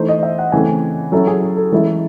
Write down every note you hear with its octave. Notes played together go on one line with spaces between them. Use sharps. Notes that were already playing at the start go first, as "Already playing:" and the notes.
Already playing: E3 A3 D#4 C5
D#5
E5
F#5
C#3 E3 A3 C4 G#5
F#3 C#4 E4 A4
G#4
G#4
A4
E3 G#3 C#4 E4 A4